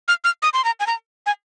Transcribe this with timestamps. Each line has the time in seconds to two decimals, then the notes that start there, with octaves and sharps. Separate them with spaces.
0.08 F6
0.24 F6
0.42 D#6
0.54 C6
0.64 A#5
0.80 G#5
0.87 A#5
1.26 G#5